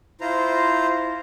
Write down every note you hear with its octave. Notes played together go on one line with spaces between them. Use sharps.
E4 F4 C5 A#5